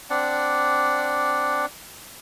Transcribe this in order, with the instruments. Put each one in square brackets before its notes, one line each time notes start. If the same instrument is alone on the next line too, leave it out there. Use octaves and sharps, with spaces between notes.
[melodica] C4 D4 D5 F#5